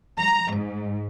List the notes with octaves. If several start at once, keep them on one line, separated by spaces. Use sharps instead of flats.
A#5
G#2